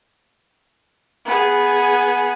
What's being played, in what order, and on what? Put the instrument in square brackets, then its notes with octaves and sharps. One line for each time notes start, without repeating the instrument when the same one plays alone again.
[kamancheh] B3 G#4